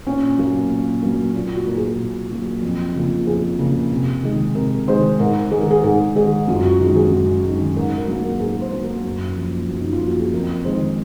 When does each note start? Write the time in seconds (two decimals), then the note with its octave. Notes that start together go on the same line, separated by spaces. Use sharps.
0.07 A#2 C#4
0.38 F#3 A#3
0.70 A#2
1.02 F#3 A#3
1.34 A#2 F4
1.55 F#4
1.67 F#3 A#3 A#4
1.77 G#4
1.99 A#2
2.31 F#3 A#3
2.63 F2
2.95 C#3 F3 A#3
3.27 F2 G#4
3.59 C#3 F3 A#3
3.92 C3
4.23 D#3 G#3
4.55 C3 A#4
4.88 D#3 G#3 C5
5.19 G#2 A#4
5.51 D#3 G#3 G#4
5.61 A#4
5.71 G#4
5.83 G#2 G#4
6.15 D#3 G#3 G#4
6.48 F#2 F4
6.63 F#4
6.81 D#3 G#3 F#4
6.96 G#4
7.11 F#2
7.44 D#3 G#3
7.76 G#2 A#4
7.97 A#4
8.08 F#3 A#3
8.19 A#4
8.40 G#2 G#4
8.61 C5
8.72 F#3 A#3
8.83 A#4
9.04 F#2
9.36 F3 A#3
9.69 F#2
9.79 D#4
9.93 F4
10.01 F3 A#3
10.06 F#4
10.20 G#4
10.33 F2 A#4
10.64 D#3 G#3 C5